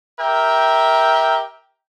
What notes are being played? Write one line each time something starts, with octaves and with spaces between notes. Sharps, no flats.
G4 A#4 E5 G5